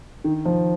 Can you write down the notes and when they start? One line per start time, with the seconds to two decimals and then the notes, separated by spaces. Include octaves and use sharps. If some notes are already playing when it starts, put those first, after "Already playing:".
0.24 D#3
0.45 F3